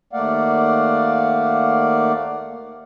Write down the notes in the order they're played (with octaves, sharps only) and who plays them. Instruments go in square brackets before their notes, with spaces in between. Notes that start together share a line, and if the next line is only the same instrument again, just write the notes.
[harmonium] D#2 A3 A#3 D5 F5 F#5